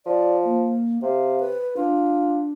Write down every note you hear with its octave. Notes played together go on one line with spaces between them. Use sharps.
F3 D5
A#3
C3 F5
B4
D4 F4